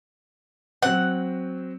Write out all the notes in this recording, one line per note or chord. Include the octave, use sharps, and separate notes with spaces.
F#3 C4 F#5